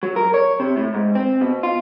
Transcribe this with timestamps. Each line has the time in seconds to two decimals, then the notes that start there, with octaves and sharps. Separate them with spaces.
0.03 F#3
0.16 A#4
0.34 C#5
0.60 C3
0.77 A2
0.94 G#2
1.15 C4
1.41 B2
1.63 F4